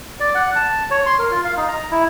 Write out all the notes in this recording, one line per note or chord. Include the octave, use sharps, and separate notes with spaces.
D5
F#5
A5
C#5
C6
A#4
F4
F5
D#4
A#5
E4